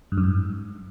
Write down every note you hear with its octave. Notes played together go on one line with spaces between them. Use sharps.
G2
F#2
G#2